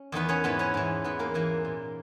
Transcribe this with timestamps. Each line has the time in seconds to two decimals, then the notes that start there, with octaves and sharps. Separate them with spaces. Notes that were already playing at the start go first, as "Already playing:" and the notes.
Already playing: C#4
0.12 E2 D#3 B3 B4
0.29 C#4 C#5
0.44 G#2 E3 B3 B4
0.59 C#4 C#5
0.74 G#2 E3
1.04 G#2 E3 B3 B4
1.19 A#3 A#4
1.34 G#2 E3 A#3 A#4
1.65 A#2